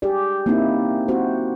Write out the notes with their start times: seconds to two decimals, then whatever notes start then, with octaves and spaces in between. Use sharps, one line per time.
0.02 G4 G#4 D5
0.46 A#3 C4 C#4 D#4 E4
1.08 C4 F#4 C5